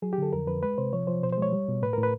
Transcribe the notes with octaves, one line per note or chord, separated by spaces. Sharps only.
F#3 G#4
G4
D3 A4
F2 A#4
F2 B4
G#3 B4
C3 C5
F3 C#5
F3 C5
B2 C5
C5
G#3 C#5
G3
B2
A2 B4
A2 A#4
B4